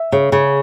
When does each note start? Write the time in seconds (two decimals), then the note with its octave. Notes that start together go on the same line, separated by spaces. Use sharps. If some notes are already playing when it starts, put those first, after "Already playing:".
Already playing: E5
0.12 C#3
0.32 C#3